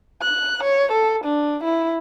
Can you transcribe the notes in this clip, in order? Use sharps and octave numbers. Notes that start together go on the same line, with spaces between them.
F#6
C#5
A4
D4
E4